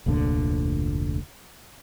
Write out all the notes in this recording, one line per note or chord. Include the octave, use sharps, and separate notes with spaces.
F1 D2 A#2 D3